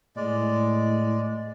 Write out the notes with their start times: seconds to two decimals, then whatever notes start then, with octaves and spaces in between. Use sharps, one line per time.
0.16 A2 G#3 D5